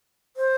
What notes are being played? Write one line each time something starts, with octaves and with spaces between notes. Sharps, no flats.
C5